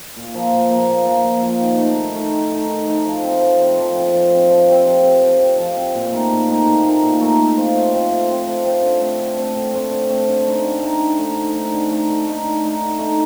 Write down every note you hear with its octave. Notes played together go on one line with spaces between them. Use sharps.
A#2
F3 A#3
A#2
F3 A#3
A#2
F3 A#3
A#2
F3 A#3
D#3
A3 D#4
D#3
A3 D#4
D#3
A3 D#4
D#3
A3 D#4
F3
C4 F4
F3
C4 F4
F3
C4 F4
F3
C4 F4
F3
C4 G4
F3
C4 G4
F3
C4 G4
F3
C4 G4
A#2
A3 D#4 A#4
A#2
A3 D#4 A#4
A#2
A3 D#4 A#4
A#2
A3 D#4 A#4
A3
C4 F4 C5
A3
C4 F4 C5
A3
C4 F4 C5
A3
C4 F4 C5
D3
A3 C4
D3
A3 C4
D3
A3 C4
D3
A3 C4
D3
A3 D#4
D3
A3 D#4
D3
A3 D#4
D3
A3 D#4
D3
A3 D#4
D3
A3 D#4
D3
A3 D#4
D3
A3 D#4